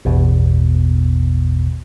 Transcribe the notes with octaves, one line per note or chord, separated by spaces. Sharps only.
A1 E2 B2